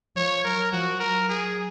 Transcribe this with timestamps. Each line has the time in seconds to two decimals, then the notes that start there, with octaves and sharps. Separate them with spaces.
0.16 F3 C#5
0.44 F#3 A#4
0.72 F3 F#4
1.00 F#3 A#4
1.29 G#4